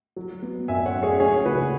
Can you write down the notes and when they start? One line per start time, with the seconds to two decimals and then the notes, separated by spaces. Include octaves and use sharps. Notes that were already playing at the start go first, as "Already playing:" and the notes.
0.16 F#3
0.43 B3
0.68 F#2 E5 G#5
0.86 C#5 F#5
0.94 F#2
1.03 G#4 C#5
1.20 C#4 G#4 C#5
1.46 C#3 F#4 B4